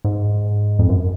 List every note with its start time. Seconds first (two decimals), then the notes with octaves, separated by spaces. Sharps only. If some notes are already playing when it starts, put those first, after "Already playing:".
0.05 G#2
0.79 F2
0.89 F#2